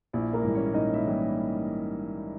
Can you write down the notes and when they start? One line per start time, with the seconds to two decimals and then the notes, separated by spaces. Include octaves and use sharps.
0.13 A#1 E4
0.33 A#3 A#4
0.44 G#2 E3 G3
0.54 C#4 C#5
0.74 A#1 D#4 D#5
0.94 E4 E5
1.06 E3 G3